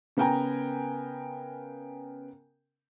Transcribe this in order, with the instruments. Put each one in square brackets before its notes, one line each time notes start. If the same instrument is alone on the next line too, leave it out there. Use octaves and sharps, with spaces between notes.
[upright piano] C#3 B3 A#4 G5 G#5 A#5